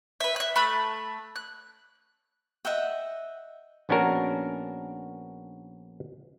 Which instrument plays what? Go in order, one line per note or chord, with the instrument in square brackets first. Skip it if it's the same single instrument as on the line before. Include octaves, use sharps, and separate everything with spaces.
[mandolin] B4 E5
E5 F#6
A3 B5 E6 F#6
F#6
[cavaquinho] D#5 E5 F#5 G5
[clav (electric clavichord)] A#1 B3 C#4 D4 F#4 A#4